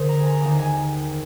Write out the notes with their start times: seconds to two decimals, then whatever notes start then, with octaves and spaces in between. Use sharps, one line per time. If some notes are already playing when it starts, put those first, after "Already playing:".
Already playing: D3 G#4 A#4 C5
0.09 A#5
0.20 G#5
0.26 A#5
0.42 D#2 D#3 A#3 A#5
0.59 G#5